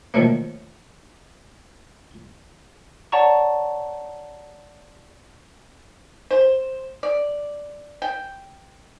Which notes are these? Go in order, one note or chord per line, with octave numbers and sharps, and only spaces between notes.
D#3 F3 F#3 A3 A#3
C#5 D5 F#5 A5 A#5 C#6
C5
D5
G5